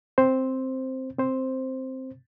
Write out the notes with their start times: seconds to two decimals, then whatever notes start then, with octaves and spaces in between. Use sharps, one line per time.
0.18 C4 C5
1.19 C4 C5